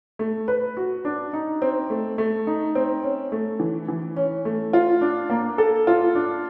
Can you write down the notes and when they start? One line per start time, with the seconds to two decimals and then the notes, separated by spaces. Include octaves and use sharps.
0.19 A3
0.48 B4
0.77 F#4
1.05 D4
1.33 D#4
1.62 C4
1.90 A3
2.18 A3
2.47 D#4
2.75 C4
3.03 C#4
3.32 A3
3.60 E3
3.88 E3
4.16 C#4
4.45 A3
4.73 F4
5.01 D4
5.30 A#3
5.58 A4
5.87 F4
6.15 D4